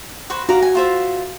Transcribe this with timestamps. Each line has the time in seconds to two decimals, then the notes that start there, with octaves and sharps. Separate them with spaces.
0.30 F#4 B4 C5
0.49 F#4 D5 F5 A#5
0.62 G#5
0.75 F4 C5 E5